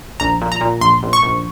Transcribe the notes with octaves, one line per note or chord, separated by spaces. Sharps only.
A#1 A#5
A#2
A#5
A#2
A#1 C6
A#1
C#6
A#1